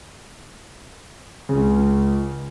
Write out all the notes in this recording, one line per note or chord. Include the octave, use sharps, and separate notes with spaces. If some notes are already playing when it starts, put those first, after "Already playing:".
C#2 C#3